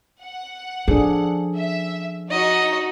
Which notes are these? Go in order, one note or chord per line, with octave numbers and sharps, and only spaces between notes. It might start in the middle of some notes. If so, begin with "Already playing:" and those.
F#5
F3 C#4 D4 G#4 A4
E5
D#4 F#4 D#5